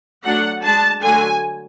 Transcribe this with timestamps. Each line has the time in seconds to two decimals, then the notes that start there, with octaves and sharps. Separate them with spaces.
0.24 F#3 A3 D4 F#5
0.63 G#3 D4 A5
1.02 D3 F#3 A3 G#5